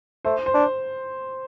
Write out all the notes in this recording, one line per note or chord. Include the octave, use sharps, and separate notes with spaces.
A3 C5
C5
D4